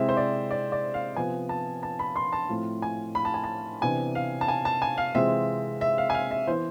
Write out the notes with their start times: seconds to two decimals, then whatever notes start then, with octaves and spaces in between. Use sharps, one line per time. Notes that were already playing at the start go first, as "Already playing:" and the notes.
Already playing: C3 G#3 C4 E4 E5
0.09 C5
0.17 D5
0.51 D5
0.72 D5
0.94 F5
1.16 C3 F3 B3 G#5
1.49 A5
1.83 A5
1.99 B5
2.16 C6
2.33 A5
2.49 A2 F3 A3 C4 F4
2.82 G#5
3.15 B5
3.25 A5
3.34 G#5
3.44 A5
3.81 C3 E3 B3 D4 G#5
4.15 F5
4.41 A5
4.48 G#5
4.65 A5
4.82 G#5
4.98 F5
5.15 C3 E3 G#3 C4 F4 E5
5.81 E5
5.98 F5
6.10 G#5
6.15 F5
6.31 E5
6.47 E3 B3 E4 C5